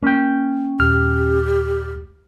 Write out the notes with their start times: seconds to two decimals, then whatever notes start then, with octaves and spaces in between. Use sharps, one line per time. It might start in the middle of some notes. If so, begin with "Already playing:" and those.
0.03 A#3 C#4 G5
0.80 D#1 G4 F6